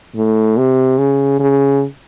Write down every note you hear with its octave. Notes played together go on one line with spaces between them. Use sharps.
A2
C3
C#3
C#3